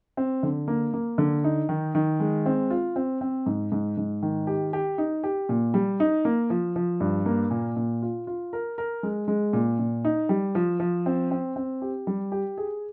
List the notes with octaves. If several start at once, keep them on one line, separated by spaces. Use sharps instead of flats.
C4
D3
A#3
A#3
D3
D#4
D#3
D#3
G#3
C4
F4
C4
C4
G#2
G#2
G#2
D#3
G4
G4
D#4
G4
A#2
G3
D#4
A#3
F3
F3
G2
A#3
A#2
A#2
F4
F4
A#4
A#4
G#3
G#3
A#2
A#2
D#4
G3
F3
F3
C4
C4
C4
G4
G3
G4
G#4